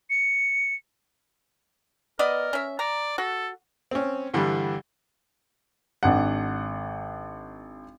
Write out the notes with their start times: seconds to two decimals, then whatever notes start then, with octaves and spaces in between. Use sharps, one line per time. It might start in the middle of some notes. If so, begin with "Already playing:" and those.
0.10 C#7
2.19 B3 A#4 D5 D#5
2.53 C#4 E5
2.79 D5 A#5
3.18 F#4 A4
3.91 C4 C#4
4.34 G2 D3 E3 G3
6.03 G#1 D4 F#5